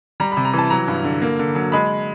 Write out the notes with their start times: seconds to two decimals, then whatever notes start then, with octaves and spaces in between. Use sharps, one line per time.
0.20 G3 A#5
0.32 B5
0.37 C3
0.45 A#5
0.53 E3
0.58 A5
0.70 F#3 A#5
0.88 G2
1.04 D3
1.22 A#3
1.39 D3
1.55 F#3
1.72 G#3 B5